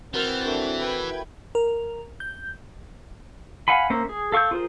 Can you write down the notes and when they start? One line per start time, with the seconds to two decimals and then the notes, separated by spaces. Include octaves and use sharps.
0.14 E3 C4 F#4 A#4 C6 F6 G6 A6
0.44 A3 D4 A#4 C#6
0.79 E4 B4 G5 G#6
1.55 A#4
2.20 G6
3.68 F5 F#5 G#5 B5
3.90 A#3 C#4 C5 E5
4.09 G#4
4.32 A4 F5 C#6 E6 G6
4.51 F4 G#4 A#4 C5